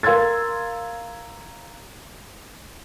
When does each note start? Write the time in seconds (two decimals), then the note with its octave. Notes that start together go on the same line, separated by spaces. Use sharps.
0.03 A#4 F5 C6 E6 G#6 A6